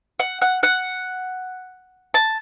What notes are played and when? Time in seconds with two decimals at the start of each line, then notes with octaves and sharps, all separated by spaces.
0.20 F#5
0.42 F#5
0.63 F#5
2.14 A5